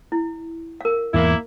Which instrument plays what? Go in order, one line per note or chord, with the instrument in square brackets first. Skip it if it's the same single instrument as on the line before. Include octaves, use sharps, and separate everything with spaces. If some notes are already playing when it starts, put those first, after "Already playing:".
[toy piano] E4
A#4 F5
[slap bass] E2 G#2 E3 [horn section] A#3 E4